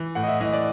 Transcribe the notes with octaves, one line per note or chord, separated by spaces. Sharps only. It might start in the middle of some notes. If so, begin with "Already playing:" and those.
Already playing: E3
A2 F#5
D#5
E5
E3 D#5
D5